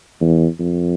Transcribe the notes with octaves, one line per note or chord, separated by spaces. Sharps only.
E2
F2